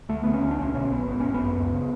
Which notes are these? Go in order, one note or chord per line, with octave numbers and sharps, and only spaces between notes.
D2 A3
D2 B3
C#4
D2
D4
B1 C#4
B2 C#4
B1 B3
G#1 B3
G#1 C#4
B3
F#2
C#2
C#3